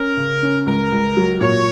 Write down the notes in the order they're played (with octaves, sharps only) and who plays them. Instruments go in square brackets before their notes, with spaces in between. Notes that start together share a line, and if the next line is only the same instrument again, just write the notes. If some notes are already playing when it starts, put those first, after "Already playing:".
Already playing: [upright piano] C#4 [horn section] A#4
[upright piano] C#3
C#4
[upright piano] C#2 [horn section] A#4
[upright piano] C#2
F#3
[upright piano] A#2 [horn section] C#5